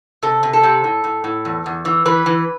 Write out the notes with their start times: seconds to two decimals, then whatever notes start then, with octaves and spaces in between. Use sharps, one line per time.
0.23 C3 A4
0.43 C3
0.53 A4
0.63 C3
0.84 A2
1.04 A2
1.24 A2
1.45 E2
1.66 E2
1.85 E3
2.06 E3 B4
2.26 E3